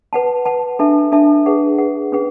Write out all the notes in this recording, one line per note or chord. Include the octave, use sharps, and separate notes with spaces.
B4 F#5 A5
B4 F#5 A5
D4 A4 E5 A5
D4 A4 E5 A5
G#4 B4 F#5
G#4 B4 F#5
C#4 G#4 B4 F#5